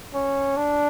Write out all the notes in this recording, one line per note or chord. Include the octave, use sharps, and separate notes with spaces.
C#4
D4